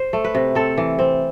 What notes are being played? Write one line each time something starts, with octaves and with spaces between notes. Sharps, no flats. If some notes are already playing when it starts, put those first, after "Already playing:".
Already playing: C5
A3
B4
C3
C4 A4
E3
C4